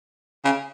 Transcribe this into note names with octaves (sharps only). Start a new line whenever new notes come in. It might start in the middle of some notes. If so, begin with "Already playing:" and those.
C#3